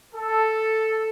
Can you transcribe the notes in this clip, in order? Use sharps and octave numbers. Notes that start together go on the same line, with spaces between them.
A4